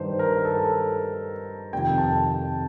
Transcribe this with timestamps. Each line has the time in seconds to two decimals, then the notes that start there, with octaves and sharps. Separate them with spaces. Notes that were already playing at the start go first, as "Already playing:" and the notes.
Already playing: G2 D#3 C5
0.19 A#4
0.45 A4
1.73 F2 C3 D#3 G5
1.98 A5